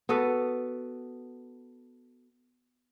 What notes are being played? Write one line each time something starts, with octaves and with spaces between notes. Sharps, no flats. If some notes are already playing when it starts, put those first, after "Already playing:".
B3 F#4 A4 B4